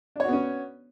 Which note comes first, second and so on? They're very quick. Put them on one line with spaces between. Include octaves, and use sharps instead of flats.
D4 C#5 F#4 B3 C#4